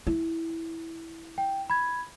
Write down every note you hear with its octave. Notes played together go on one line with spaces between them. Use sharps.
E4
G5
B5 G#6